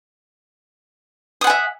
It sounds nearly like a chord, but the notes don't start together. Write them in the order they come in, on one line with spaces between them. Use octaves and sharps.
D#6 F#5 G#5 E5